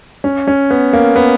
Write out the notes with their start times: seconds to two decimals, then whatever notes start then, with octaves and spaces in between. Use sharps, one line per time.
0.24 C#4
0.47 C#4
0.71 B3
0.93 A#3
1.16 B3